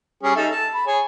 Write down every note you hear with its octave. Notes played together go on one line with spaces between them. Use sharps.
G3 C#4 G#4
D#4 A4 E5
A5
B5
G#4 C#5 G#5